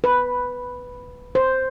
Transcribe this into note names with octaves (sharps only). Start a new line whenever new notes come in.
B4
C5